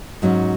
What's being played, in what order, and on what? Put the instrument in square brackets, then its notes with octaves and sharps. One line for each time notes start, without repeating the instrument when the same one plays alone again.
[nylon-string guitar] G#2 F#3 C#4